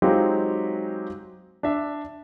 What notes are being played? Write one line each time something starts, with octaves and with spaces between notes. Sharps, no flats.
F#3 G#3 C4 D#4 F4 G4
D4 E5